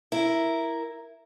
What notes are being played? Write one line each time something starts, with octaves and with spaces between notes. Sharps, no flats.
E4 A#4